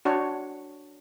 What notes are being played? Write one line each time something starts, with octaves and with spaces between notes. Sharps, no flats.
D4 F#4 C#5